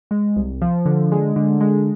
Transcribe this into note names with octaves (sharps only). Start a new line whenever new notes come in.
G#3
C2
F3
D3
G#3
D3
G#3